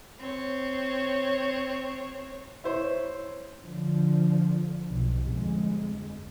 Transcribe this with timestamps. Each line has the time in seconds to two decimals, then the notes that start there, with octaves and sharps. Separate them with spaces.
0.19 C4 C#5
2.64 E4 C5 C#5
3.61 D3 F3
4.88 B1
5.21 G1 F2 G#3